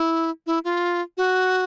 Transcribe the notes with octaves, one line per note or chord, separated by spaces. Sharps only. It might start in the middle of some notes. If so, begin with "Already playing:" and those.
Already playing: E4
E4
F4
F#4